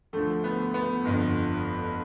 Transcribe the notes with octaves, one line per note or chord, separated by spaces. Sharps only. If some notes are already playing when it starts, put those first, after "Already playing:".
D2 D3 F3 A3
B3
B3
G1 F2 D3